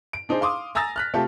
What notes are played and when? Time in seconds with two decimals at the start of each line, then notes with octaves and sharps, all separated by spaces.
0.13 D7
0.29 D4 D#4 G#4 C5
0.41 F5 C6 D6 D#6
0.75 G#5 A#5 D#6 E6 A6 A#6
0.96 F6 F#6 B6
1.14 C3 A3 F4 G4 A4